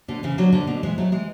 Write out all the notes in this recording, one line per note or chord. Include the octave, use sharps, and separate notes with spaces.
B2 D3
C#3 E3
D3 F#3
B2 D3
B2 D3
E3 G#3
F#3 A3
E3 G#3